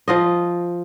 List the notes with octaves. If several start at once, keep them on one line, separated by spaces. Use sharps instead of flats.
F3 F4 D#5